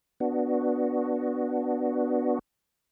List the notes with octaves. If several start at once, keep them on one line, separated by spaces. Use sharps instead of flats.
B3 D4 F#4